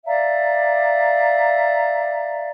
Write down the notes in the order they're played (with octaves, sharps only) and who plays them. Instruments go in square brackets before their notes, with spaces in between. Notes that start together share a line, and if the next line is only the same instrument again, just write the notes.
[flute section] D5 E5 F5 A#5